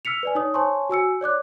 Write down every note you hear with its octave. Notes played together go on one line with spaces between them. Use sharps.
E6 F6 B6 C#7 F7
B4 D5 G#5
D#4 C#5 D#6
C5 C#5 G#5 A5 C6 C#6
F#4 G#5 E6 C#7
C#5 D5 D6 F#6